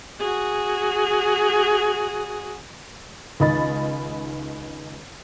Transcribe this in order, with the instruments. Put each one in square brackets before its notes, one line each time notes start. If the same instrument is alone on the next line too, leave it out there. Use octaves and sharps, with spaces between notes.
[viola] F#4 G#4
[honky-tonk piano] C#2 D#3 D#5 B5 A6